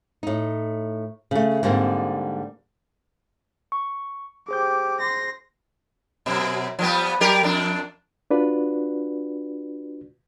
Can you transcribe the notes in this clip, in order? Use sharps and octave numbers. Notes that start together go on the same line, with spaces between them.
A2 D#4
C#3 A3
G#2 D3 G3 A#3 C4
C#6
G4 G#4 C5 D6 G6
C6 A#6
F#2 B2
F3 G3 B3
F#3 G4 A#4
F2 D4
D4 F4 F#4 B4 D5